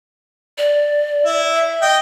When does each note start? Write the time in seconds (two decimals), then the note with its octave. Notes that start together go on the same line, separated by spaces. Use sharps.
0.58 D5
1.25 E4
1.56 E5
1.82 D#5 G5